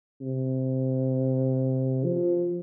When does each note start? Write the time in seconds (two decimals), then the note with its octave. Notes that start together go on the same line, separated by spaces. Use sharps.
0.21 C3
2.04 F3